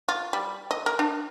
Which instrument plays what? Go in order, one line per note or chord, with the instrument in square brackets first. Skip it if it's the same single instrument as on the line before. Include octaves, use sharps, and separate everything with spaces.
[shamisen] F4
G3
D#5
A#4
D4